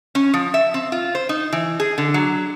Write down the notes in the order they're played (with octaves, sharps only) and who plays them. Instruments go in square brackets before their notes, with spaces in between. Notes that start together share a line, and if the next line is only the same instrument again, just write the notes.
[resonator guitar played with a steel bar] C#4
F3
E5
C4
F4
C5
D#4
E3
G#4
D3
F#3